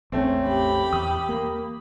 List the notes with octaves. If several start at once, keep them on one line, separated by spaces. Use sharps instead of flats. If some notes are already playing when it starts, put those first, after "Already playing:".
A1 E2 A3 C4 C#4
G4 B5
E2 D#6
A#3